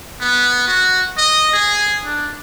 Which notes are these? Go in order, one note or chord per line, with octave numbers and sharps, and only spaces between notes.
B3
F#4
D#5
G#4
D4